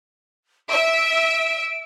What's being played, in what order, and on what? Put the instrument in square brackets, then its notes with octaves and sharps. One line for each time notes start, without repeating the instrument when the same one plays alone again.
[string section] E5 [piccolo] D7